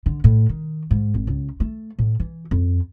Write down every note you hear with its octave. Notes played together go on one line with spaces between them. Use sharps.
D3
A2
D#3
G#2
G#1
C#2
A3
A2
E3
F2